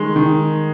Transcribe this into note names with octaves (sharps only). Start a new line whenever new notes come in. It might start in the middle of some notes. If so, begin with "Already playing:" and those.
Already playing: D#3 G#3
D#3